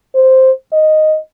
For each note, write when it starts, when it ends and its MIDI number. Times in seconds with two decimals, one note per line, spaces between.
0.15 0.51 72
0.73 1.17 75